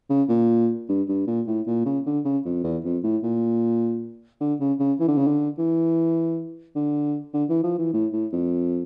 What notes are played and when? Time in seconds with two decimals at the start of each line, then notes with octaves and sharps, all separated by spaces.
0.10 C#3
0.29 A#2
0.89 G2
1.09 G2
1.27 A#2
1.47 A2
1.67 A#2
1.86 C#3
2.06 D3
2.25 C#3
2.45 F2
2.64 E2
2.85 F2
3.03 A2
3.23 A#2
4.41 D3
4.60 C#3
4.80 C#3
5.00 E3
5.08 D3
5.18 C#3
5.27 D3
5.58 E3
6.76 D3
7.34 D3
7.49 E3
7.64 F3
7.79 E3
7.93 A2
8.13 A2
8.33 F2